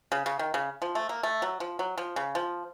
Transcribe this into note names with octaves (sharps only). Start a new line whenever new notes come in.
C#3
C#3
D#3
C#3
F3
A3
A#3
A3
F#3
F3
F#3
F3
C#3
F3